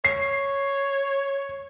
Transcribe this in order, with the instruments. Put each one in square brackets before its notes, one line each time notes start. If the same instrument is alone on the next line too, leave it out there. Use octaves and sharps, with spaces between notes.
[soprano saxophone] C#5 [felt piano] C7